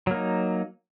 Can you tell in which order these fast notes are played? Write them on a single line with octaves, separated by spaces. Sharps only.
F#3 A#3 D#4